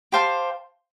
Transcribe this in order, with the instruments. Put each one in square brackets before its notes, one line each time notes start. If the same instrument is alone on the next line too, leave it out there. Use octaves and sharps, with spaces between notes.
[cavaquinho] G4 C5 F5 A5